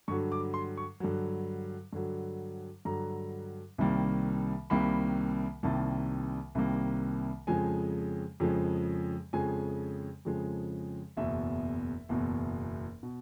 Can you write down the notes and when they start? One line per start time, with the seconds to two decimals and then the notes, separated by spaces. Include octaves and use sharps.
0.08 G2 D3 F#3 C#6
0.32 D6
0.54 C6
0.77 C#6
1.00 G2 D3 F#3
1.93 G2 D3 F#3
2.85 G2 D3 F#3 A#5
3.78 C2 C3 D#3 G3 A#3
4.70 C2 C3 D#3 G3 A#3 B5
5.63 C2 C3 D#3 G3 A#3 A5
6.55 C2 C3 D#3 G3 A#3
7.47 F2 C#3 F3 G#3 G#5
8.40 F2 C#3 F3 G#3
9.33 F2 C#3 F3 G#3 G#5
10.25 F2 C#3 F3 G#3
11.17 F#1 E2 B2 E5
12.09 F#1 E2 B2
13.03 B2